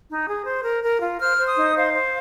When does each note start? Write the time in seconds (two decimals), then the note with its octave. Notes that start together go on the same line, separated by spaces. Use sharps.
0.08 D#4
0.26 G#4
0.45 C5
0.63 A#4
0.83 A#4
1.00 F4
1.19 C5 F6
1.38 C5
1.47 D#6
1.56 D#4
1.76 C5 F5
1.93 C5